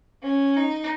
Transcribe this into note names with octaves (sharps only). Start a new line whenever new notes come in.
C#4
D#4